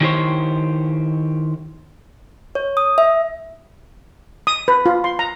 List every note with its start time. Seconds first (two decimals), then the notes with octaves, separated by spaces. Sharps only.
0.01 D#3 E4 G4 G#4 C5 C#5
2.55 C#5
2.77 D#6
2.98 E5
4.47 D#6
4.68 B4
4.86 F4
5.04 C6
5.19 A#5